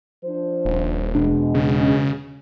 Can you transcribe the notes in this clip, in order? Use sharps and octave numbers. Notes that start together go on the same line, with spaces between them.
F3 D4 C5
D#1
E1 B2 G#3 D4
C#3